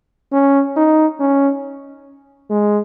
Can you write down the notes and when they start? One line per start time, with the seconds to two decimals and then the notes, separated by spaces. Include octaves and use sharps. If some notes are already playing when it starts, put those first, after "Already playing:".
0.32 C#4
0.76 D#4
1.20 C#4
2.50 G#3